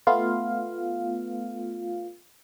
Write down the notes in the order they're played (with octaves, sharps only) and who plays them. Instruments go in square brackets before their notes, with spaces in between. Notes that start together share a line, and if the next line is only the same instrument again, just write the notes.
[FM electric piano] A3 B3 F4 F5